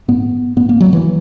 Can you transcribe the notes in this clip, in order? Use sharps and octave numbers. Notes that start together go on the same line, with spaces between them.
G#2 B3
G#2 B3
A#3
F#3
E3